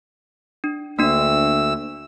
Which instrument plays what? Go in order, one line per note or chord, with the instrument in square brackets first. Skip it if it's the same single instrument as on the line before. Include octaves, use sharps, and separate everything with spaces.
[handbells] D4
[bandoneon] D2 E6 [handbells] A#3 D4